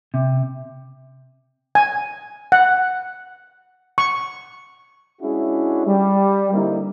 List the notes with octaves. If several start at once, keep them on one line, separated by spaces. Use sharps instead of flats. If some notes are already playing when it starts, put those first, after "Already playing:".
C3
G#5
F#5
C#6
G#3 C#4 D4 E4 F#4 G#4
G3
D3 G3 A#3 C4 D#4 E4